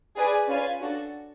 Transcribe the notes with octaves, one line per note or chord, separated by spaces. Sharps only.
G#4 B4 D5 G#5
C#4 F4 B4 F5 G#5
D4 F#4 A4